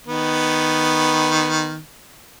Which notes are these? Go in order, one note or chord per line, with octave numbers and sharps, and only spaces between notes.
D#3 B3